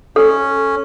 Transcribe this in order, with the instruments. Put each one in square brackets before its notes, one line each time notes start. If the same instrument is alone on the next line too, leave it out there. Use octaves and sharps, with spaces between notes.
[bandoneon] C#4 [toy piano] A4